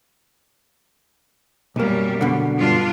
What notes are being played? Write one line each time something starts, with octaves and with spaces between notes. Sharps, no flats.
B1 F#2 G3 A#3
B2 D3
G2 D4 F4